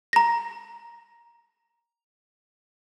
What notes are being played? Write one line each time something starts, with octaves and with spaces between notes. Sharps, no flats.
A#5 A#6